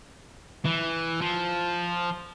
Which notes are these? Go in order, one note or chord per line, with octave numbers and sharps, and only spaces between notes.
E3
F3